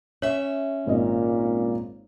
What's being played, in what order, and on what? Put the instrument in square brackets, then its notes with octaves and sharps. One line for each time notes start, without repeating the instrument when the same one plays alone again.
[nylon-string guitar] C#4 E5 [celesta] C#5
[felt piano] G#1 D#5 [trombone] A#2